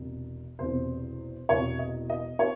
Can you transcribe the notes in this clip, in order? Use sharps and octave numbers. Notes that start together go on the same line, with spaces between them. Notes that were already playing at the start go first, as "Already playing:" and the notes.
Already playing: E1 C3
E1 E2 C3 C5
E1 E2 C3 C#5
D#5
D#5
C#5